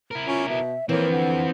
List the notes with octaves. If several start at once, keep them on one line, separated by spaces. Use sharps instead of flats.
E4 A#4
C#4 F4
B2 E5
E3 F3 A#3 C4 C#5
D3 F#5